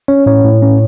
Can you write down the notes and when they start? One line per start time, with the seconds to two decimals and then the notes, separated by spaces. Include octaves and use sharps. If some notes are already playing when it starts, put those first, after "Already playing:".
0.08 C#4 C#5
0.26 A2 C#5
0.44 A2
0.63 C#4